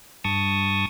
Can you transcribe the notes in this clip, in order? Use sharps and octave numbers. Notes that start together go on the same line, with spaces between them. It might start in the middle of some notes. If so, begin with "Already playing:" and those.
G2 A5 C#6 D#6